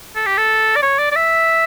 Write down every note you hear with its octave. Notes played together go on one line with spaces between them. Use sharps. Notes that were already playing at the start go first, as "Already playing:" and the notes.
A4
G4
A4
D5
C#5
D5
D5
E5